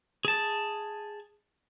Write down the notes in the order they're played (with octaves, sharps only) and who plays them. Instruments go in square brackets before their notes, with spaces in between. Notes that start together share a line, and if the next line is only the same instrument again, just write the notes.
[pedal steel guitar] G#4 A5